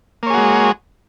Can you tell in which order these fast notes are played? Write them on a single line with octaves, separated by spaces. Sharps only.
A#3 C#5 G#4 F#4 G#3